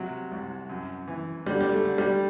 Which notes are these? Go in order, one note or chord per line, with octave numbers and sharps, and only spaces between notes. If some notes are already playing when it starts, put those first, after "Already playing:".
Already playing: C3 F#3
C2
F#2
E3
D3 G3
G3
A3
D3
G3